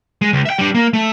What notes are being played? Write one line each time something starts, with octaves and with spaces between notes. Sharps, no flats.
G#3
C#2
E5 G5
G3 D4
A#3
A3